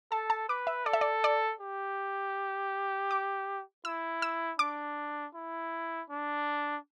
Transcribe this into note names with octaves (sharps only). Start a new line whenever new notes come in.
A4 A5
A5
B4 D6
E5
A4 D5
E5
D5
D5
G4
D6
E4 E6
E6
D4 D6
E4
D4